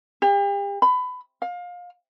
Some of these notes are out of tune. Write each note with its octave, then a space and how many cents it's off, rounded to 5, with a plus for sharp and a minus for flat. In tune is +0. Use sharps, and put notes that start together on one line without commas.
G4 +40
B5 +25
F5 +25